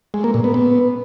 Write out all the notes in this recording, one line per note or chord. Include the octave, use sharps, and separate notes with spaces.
G#3
A#3
A#2
B3
B3